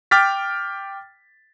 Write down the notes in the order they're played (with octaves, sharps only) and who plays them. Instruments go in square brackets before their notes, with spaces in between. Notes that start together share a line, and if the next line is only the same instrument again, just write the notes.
[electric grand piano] G5 D6 F6 A6 B6